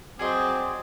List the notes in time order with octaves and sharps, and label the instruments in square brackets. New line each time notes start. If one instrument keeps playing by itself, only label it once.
[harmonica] F#3 C4 D6 [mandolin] G#4 D5 D#5